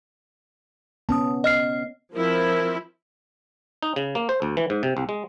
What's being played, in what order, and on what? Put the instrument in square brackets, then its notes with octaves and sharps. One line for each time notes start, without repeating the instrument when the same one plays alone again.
[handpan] B3 C#4 [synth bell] A5 D#6
[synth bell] D#5 F6 C7
[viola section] F3 C4 E4 [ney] A#4
[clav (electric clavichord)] D#4
C#3
A#3
C5
D2
E3
G#2
C3
C2
G#3